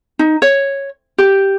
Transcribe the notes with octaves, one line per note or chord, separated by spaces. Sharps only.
D#4
C#5
G4